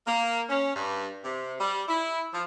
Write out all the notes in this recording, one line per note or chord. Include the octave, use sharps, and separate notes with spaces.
A#3
C#4
G2
C3
G3
E4
F3